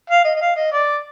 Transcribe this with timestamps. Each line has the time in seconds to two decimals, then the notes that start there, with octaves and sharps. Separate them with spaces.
0.10 F5
0.25 D#5
0.35 D#5
0.41 F5
0.56 D#5
0.72 D5